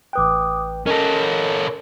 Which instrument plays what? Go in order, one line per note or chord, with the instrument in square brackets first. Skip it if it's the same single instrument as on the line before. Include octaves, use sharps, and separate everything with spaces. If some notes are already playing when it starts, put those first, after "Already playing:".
[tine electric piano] A1 B4 G5 [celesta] D6 D#6 F#6
[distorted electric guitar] C#4 A4 [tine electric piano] A#4 [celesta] D#5 A#6